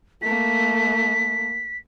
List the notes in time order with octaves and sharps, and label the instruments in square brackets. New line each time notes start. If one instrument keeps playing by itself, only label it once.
[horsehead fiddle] A3 A#3 [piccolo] B6